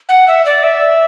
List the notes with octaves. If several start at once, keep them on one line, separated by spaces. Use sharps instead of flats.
F#5
E5
D5
E5